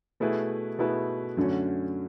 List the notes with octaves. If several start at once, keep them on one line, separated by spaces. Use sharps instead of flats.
B2 A3 E4 G#4 B4
B2 A3 E4 G#4 B4
F#2 D3 A3 C#4 F#4